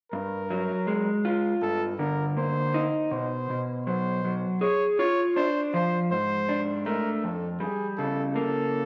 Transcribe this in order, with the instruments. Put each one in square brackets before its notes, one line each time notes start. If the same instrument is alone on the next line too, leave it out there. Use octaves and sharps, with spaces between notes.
[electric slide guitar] G2 [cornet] A#4
[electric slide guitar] F#3
G#3
F4
[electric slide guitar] G2 [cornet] A4
[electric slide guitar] D3 [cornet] A#4
[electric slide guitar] A#3 [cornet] C5
[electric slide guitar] D#4
[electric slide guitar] B2 [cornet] C5
[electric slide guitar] B2
[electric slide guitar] F#3 [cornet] C5
[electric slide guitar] F#3
[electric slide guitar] G#4 [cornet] C#5
[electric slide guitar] F4 [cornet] C#5
[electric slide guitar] D4 [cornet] C5
[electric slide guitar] F3 [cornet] C5
[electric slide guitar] G#2 [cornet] C5
[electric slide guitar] D4
[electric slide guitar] A3 [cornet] A#4
[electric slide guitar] F2 [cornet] A4
[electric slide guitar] G3 [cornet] G#4
[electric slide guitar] C#3 [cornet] A4
[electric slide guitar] A#3 [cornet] A4